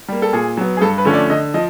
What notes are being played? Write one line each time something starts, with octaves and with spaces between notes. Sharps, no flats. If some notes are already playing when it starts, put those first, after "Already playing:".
G3 A#3
A4
A#2 G#4
F#3 B3
G#4
G2 A4
B4
D3 F3 A3 C#4
D5
D3 D#5
F3 D#5